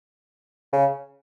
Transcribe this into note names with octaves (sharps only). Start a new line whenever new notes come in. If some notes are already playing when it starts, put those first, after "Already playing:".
C#3